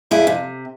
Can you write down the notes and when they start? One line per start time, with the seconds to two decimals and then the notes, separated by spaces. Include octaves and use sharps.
0.11 F2 E4 G#4
0.27 C3